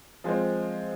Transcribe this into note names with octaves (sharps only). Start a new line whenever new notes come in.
F3 G#3 C4